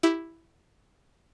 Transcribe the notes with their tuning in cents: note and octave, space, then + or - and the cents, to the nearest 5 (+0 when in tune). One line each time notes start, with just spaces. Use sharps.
E4 +0 G4 +0